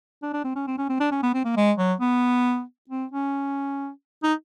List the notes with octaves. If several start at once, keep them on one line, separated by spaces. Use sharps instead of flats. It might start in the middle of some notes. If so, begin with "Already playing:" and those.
D4
D4
C4
C#4
C4
C#4
C4
D4
C#4
B3
C4
A#3
G#3
F#3
B3
C4
C#4
D#4